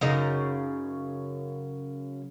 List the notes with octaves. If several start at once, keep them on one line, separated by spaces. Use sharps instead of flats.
F#2 C#3 D#4